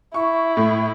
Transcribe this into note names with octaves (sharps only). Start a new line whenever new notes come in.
E4 C#6
A2